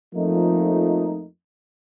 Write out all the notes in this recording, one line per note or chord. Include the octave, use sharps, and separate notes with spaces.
F2 F3 A3 A#3 D#4